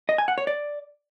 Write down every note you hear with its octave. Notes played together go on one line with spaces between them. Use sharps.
D#5
G#5
F#5
C#5
D5